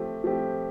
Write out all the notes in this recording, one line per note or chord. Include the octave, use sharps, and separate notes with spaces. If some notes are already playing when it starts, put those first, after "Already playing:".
Already playing: F3 A3 C4 G4
F3 A3 C4 G4